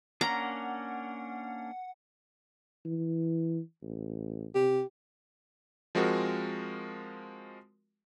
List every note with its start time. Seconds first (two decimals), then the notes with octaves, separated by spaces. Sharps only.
0.21 A#3 C#4 D4 F#5 A#5
2.85 E3
3.82 A1
4.55 C3 G4
5.95 F3 G#3 C4 F#4 A#4